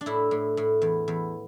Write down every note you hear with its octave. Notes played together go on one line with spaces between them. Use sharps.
D4
A2 E4
A2
A2
E2
E2